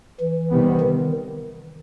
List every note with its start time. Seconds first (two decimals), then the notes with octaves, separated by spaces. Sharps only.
0.20 E3
0.50 C3 D#3 G3 B3
0.80 D#3